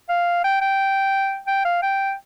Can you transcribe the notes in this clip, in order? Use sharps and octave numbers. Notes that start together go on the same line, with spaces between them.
F5
G5
G5
G5
F5
G5